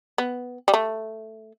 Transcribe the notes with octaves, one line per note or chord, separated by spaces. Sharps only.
B3
G3
A3